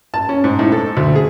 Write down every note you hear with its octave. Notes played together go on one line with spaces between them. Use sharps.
A5
C#4
G#2
A2
A4
D2
G#4